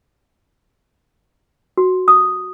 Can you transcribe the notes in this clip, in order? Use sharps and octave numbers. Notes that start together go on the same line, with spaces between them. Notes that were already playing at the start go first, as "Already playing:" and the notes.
F#4
D#6